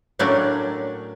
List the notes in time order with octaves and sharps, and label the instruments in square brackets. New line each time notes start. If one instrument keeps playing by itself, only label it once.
[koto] A2 F#3 A3 A#3 C#4 D4